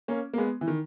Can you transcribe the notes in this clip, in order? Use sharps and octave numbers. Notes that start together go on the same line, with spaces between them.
A#3 C#4
A#3
G#3 B3
E3
D#3